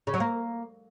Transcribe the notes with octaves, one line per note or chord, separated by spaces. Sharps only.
C#3
F#3
A#3